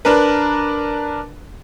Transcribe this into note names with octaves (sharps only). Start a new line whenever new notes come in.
D4 A#4 B4